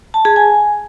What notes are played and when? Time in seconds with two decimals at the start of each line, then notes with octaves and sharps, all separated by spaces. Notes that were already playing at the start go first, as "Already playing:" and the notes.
0.14 A5
0.25 G#4
0.36 G#5